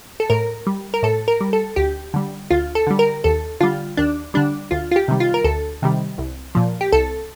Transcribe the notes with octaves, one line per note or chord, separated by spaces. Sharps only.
A4
A2 A#4
G3
A#4
A2 A4
A#4
G3
A4
D2 G4
D3 G3
D2 F4
A4
D3 G3
A#4
D#2 A4
D3 G3 F4
D#2 D4
D3 G3 D4
D2 F4
F4
G4
C3 D#3 G3
F4
A#4
D2 A4
C3 D#3 G3
C2
A#2 F3
G4
C2 A4